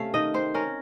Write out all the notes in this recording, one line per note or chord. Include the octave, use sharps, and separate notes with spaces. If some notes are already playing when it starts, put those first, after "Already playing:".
Already playing: C3 A3 C#4 F5
D#3 D#5
C4 C5
C#4 A#4